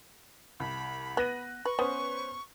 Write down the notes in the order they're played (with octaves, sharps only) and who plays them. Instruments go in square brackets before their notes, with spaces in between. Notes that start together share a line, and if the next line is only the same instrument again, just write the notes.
[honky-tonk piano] C2 [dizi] B5
[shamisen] B3 [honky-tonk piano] F#6 A#6 D#7
[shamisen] B4 [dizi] C#6
[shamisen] B3 [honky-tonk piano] C#4 B4 C5